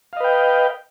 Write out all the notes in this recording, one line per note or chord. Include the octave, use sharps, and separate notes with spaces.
B4 D#5 F5 G5